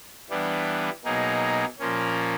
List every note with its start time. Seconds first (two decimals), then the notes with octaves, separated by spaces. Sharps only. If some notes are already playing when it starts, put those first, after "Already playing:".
0.30 E3 G3 B3 D4
1.04 B2 F#3 A#3 D#4 G#4
1.79 A#2 F3 A#3 C#4